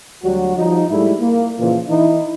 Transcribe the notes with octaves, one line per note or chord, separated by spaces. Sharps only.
D2 F#3 G3 F#4
F3 G3 D#4
G#2 G3 A3 E4
A#3
A#2 C#3 E3 F3 A#3 F4
E3 D#4 E4